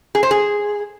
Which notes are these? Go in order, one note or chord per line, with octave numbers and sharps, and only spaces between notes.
G#4
C5
G#4